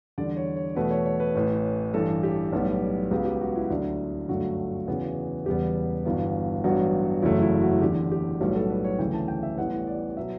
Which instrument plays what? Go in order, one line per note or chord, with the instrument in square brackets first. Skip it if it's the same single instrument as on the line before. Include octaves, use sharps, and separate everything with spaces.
[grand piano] E2 D3 G3 D5
C#5
C#5
E2 B2 A3 B4
C#5
C#5
B4
A1 A2 E3
A1 G2 E3 A4
G4
B1 A2 G3 B3
C#2 C#3 F#3 B3 G4
G4
F#4
E4
D2 D3 F#3 D4
G1 F#2 D3 F#3 A3 F#4
E2 C#3 E3 B3
E1 E2 C#3 G3 B3 G4
G1 G2 E3 B3 F#4
A1 G2 F#3 B3 F#4
F#1 E2 C#3 F#3 A3 E4
E4
F#4
E1 E2 D3 G4
G4
B1 A2 G3 B3 F#4
A4
B4
C#5
D2 C#3 E3 A3 G5
A5
G5
E5
A1 A2 E3 G3 B3 F#5
D5
B2 F#3 B3 E5